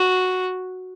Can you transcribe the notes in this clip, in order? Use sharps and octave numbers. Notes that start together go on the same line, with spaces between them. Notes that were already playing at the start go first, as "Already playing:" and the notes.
Already playing: F#4